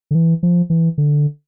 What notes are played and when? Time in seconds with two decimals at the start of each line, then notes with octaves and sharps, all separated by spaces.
0.11 D3
0.15 E3
0.43 F3
0.70 E3
0.98 D3